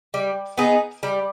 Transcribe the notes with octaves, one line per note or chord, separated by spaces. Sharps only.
G3
B3 D#4 G#4
G3